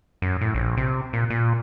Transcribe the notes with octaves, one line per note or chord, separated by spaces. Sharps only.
F#2
A2
A#1
C3
A#2
A#2